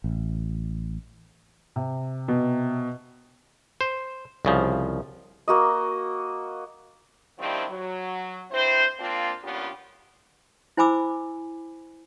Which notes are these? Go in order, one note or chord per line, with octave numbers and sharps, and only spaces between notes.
A1
C3
B2
C5
C2 C#3 F3
A#3 F#4 D#5
D#3 F3 G3 C4 D4 E4
F#3
G2 C4 E4 C5
A#3 C4 D4 F4
G2 A#2 B3 C#4 F4 G4
E4 C5 G#5 B5 D6 E6